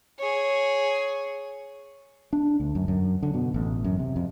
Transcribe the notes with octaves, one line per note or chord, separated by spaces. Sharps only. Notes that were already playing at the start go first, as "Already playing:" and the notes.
G#4 C#5
D4
D2
F#2
F#2
D3
B2
A1
F#2
C3
F2